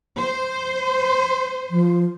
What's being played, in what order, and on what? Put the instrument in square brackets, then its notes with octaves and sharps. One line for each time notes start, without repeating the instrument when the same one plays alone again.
[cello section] C5
[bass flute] F3